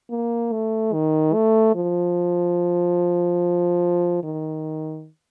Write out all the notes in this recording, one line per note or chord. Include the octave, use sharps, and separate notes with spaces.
A#3
A3
D#3
A3
F3
D#3